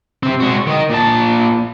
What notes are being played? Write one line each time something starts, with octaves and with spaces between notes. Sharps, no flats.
C3 C4
G#3 F#4
D#3 D#5
A#2 A5